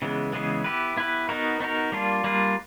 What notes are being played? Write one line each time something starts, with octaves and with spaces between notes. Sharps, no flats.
C#3 E3 G#3 B3
C#3 E3 G#3 B3
B3 E4 G4 B4
B3 E4 G4 B4
B3 D#4 F#4 A#4
B3 D#4 F#4 A#4
G3 A#3 D4 F4
G3 A#3 D4 F4